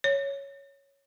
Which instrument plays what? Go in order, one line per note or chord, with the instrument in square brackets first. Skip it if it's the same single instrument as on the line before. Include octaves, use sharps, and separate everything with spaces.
[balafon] C#5